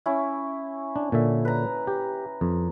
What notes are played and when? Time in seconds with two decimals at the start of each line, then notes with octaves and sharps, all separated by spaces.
0.06 C#4 E4
0.96 D4
1.12 A#2 D3 E5
1.45 B4 A#5
1.87 G4
2.41 F2